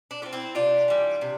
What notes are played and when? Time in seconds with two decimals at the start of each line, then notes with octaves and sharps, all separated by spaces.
0.11 D4
0.22 A3 C4 F4
0.33 C4 E4
0.55 C3 D4 F4
0.88 E3 G3
1.21 C3